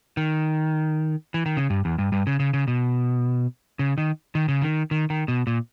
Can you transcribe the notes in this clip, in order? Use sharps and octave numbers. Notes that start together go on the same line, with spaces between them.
D#3
E3
D#3
C#3
G2
E2
G2
G2
C#3
C#3
C#3
B2
C#3
D#3
D#3
C#3
D#3
D#3
D#3
B2
A#2